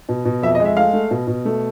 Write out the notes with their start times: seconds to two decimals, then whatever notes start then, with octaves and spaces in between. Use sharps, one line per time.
0.09 B2
0.25 B2
0.42 F2 E5
0.55 D#5
0.60 G#3
0.65 E5
0.77 A3 F5
0.93 A3
1.11 B2
1.27 B2
1.45 A3